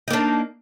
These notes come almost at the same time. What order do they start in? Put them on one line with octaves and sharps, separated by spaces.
D#4 A#3 D4